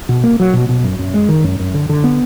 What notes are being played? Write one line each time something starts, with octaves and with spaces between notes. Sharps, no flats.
B2
A#3
F#3
B2
B2
F#2
F#2
G#3
D#3
F#2
F#2
D3
D3
B3